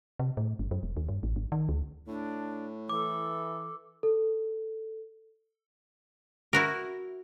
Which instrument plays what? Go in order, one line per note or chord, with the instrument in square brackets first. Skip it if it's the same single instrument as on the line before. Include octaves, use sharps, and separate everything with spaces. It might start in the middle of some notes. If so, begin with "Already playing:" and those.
[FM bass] C3
A2
G1
F#2
E1
D#2
G2
A1
G#1
D#3
D2
[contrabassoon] A2 [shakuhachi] D4
[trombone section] E3 [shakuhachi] A4 [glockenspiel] D6
[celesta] A4
[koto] E4 F#4 A#4